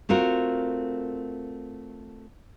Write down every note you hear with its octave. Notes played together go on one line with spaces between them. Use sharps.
A3 C4 F4 F#4 A#4